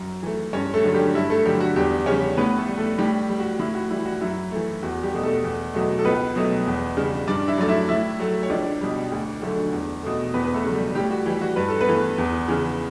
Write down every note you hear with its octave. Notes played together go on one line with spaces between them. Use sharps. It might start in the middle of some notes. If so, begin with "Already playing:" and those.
Already playing: F#2
E3 A3
G2 C#4 C#5
A3 A4
D3 F#3 A3
G3 G4
G2 E4
A3 A4
D3 F#3 G3 G4
F#4
E2 G3 G4
C#3 G3 C#4 C#5
A2 B3 B4
A3 A4
G3
A3 A4
A2 G3 G4
G3
F#4
A2 E4
F#4
E3 G3 E4
F#4
F#2 E4
E3 A3
E2 F#4
G3 G4
B2 A3
A3 A4
E2
B2 F#3 A3
A4
C#2 B3 B4
B2 F#3 A3
E2
C#3 G3
G2 D4 D5
E4 E5
F#3 A3 D5
E4 E5
A2 E4 E5
F#3 A3
C#5
C#2 D4 D5
B2 G3
D2
D3 F#3 A3
E2
B2 A3
E2 B3 B4
B4
A3 A4
C#3 F#3 A3
G3 G4
A2 G3 G4
F#4
E3 G3
F#4
G2 B4
A4
B3 B4
E3 A3
E2
C#3 E3